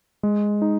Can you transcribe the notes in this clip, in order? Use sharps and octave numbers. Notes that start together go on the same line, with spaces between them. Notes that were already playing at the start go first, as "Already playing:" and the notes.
G#3
D#4